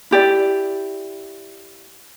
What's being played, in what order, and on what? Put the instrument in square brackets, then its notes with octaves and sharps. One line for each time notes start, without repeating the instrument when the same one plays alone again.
[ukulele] E4 G4 D5